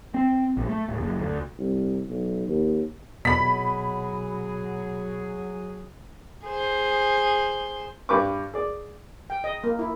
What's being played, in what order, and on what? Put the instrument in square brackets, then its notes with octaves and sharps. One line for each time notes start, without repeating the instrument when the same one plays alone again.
[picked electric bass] C4
A#1
A3
D1
F#1
D2
[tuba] C2
B1
D#2
[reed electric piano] B2 [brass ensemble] F#3 G#4 [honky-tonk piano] B5 B6
[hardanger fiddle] G#4 C5
[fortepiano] G2 B4 D5 C#6 D6
G#4 D5
[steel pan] G5
D#5
A#3
E4